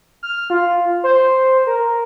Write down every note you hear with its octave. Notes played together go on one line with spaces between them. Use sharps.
F6
F4
C5
A#4